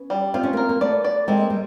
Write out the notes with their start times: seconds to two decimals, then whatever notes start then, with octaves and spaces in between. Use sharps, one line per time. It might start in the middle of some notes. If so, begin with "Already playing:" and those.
Already playing: B3 C#4
0.10 G3
0.34 C4 F4
0.43 C#4
0.53 A#3 C4 A#4
0.69 A#3
0.81 A3 B3 D5
1.04 D5
1.27 G#3 A#3 C4
1.50 G3